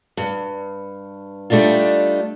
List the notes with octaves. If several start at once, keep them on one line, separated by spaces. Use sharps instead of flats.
G2
G3 A3 D4 D#4 F4